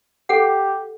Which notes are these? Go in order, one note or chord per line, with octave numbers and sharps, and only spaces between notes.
G4 A4 F#5